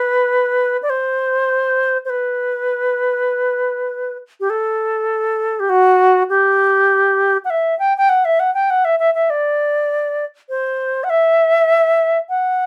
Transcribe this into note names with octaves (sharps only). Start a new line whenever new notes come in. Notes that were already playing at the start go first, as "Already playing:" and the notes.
Already playing: B4
D5
C5
C5
B4
G4
A4
G4
F#4
G4
F#5
E5
G5
G5
F#5
E5
F#5
G5
F#5
E5
E5
E5
D5
C5
F#5
E5
F#5